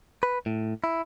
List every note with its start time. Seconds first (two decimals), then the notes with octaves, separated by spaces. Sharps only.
0.23 B4
0.46 A2
0.84 E4